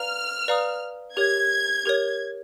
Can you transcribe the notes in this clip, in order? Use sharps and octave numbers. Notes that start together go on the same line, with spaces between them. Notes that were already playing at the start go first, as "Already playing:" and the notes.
Already playing: B4 D5 F5 A#5 F6
B4 D5 F5 A#5 D#6
G4 A#4 C#5 G#6
G4 A#4 C#5